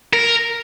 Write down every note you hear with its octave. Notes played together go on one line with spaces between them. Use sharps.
A#4